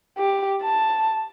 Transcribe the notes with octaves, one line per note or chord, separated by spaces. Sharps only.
G4
A5